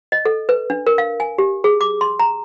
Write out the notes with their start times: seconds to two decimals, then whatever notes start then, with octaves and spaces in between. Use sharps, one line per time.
0.12 D#5
0.25 A4
0.49 B4
0.70 D4
0.87 A#4
0.98 F5
1.20 G#5
1.38 G4
1.64 G#4
1.81 D6
2.01 C6
2.20 A#5